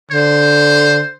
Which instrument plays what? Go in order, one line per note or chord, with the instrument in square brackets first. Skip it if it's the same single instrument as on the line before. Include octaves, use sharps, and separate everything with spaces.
[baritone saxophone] D3 [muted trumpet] C5